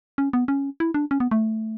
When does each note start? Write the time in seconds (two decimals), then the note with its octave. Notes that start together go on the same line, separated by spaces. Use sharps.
0.18 C#4
0.33 B3
0.48 C#4
0.80 E4
0.94 D4
1.11 C#4
1.20 B3
1.31 A3